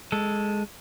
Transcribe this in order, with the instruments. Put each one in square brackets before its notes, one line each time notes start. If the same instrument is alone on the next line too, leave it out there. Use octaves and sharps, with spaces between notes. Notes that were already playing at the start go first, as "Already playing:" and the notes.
[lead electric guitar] G#3 A4